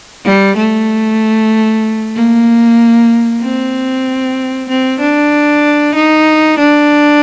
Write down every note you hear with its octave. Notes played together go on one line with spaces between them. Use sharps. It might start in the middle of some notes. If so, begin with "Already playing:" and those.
G3
A3
A#3
C4
C4
D4
D#4
D4